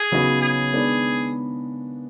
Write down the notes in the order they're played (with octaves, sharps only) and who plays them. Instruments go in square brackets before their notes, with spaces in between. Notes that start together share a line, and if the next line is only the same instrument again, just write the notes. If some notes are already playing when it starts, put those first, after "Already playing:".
Already playing: [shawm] G#4
[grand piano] C#3 F#3 B3 D#4 F#4
[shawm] G#4
[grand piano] D#3 G#3 B3 D4